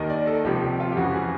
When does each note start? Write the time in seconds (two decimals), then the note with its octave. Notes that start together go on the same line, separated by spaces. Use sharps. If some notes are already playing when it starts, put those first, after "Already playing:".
Already playing: D#2 D#3 D#5
0.10 D5
0.27 A4
0.45 C#2 C3 F3 G4
0.80 F4
0.92 G4
0.97 F2 C#3 E3 F#4
1.14 G#4